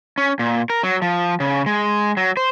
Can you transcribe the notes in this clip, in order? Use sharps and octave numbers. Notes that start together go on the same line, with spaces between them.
C#4
A#2
A#4
F#3
F3
C#3
G#3
F#3
C5